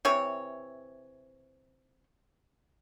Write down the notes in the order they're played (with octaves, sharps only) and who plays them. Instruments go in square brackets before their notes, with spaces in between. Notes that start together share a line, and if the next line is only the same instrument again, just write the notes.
[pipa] C3 E3 C#5